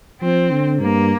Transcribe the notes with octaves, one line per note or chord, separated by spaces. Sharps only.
F3 C4
D3
G2 A#3